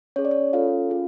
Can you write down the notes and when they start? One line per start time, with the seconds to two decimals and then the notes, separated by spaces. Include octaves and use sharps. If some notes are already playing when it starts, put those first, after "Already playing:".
0.16 C#4 G#4 C#5
0.25 D5
0.31 C#5
0.53 C#4 F4 A4 F5
0.90 C#4 F4 G#4